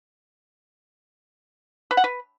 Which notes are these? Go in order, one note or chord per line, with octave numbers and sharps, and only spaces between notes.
B4
F#5
B4